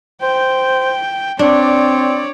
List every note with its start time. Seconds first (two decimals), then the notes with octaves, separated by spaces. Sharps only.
0.22 C5 G5
1.39 C4 D4 C#5 D5